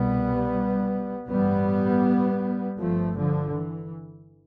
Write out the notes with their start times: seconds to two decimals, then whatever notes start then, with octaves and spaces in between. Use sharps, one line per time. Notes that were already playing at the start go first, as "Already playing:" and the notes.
Already playing: C2 B2 G3 B3
1.28 A1 G2 G3 B3
2.79 G1 G2 F3 A3
3.18 D3 F3
3.55 E3